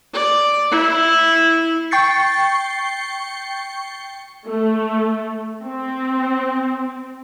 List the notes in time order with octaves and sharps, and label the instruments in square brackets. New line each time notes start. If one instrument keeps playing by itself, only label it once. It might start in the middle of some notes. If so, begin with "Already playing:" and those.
[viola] D5
E4
[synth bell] G5 C#6 G6 A6 C7 C#7
[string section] A3
C4